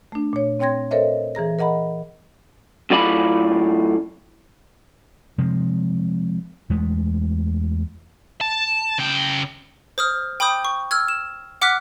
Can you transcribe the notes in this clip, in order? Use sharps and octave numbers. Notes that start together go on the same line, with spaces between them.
A3 D4
A#2 C#5
C4 C#5 G5 C6 G#6 A#6
A4 A#4 C5 C#5 D#5 E5
E3 G#4 A#5 A#6
A#4 D#5 F#5 A#5 B5
F#2 A2 F4 D5 B5
C3 F3 G#3
E2 G#3 A3
A5
C#3 G5
C5 D#6 F6
G5 B5 D6 D#6 G6
C#6
E6 F6 G#6
E7
F#5 D6 F6 F#6 B6